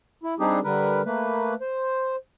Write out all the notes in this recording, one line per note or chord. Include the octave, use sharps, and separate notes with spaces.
E4
G3 C4 D4 D#4 G4 G#4
D3 G3 A#4 B4
A3 A#3 B4
C5